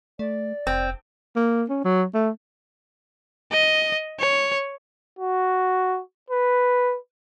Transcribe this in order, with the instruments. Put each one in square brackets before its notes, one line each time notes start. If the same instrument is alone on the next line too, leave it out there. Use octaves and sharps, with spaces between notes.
[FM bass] A3 [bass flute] D5
[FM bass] F1 [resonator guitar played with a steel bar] C4
[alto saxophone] A#3
C#4
F#3
A3
[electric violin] D#5
C#5
[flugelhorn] F#4
B4